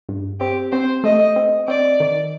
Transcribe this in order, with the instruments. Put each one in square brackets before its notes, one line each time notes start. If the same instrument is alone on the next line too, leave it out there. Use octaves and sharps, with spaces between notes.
[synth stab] G2
[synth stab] C4 [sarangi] G4
[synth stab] C4 [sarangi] C5
[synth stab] A3 [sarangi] D#5
[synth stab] C4
[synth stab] C4 [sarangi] D5
[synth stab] D#3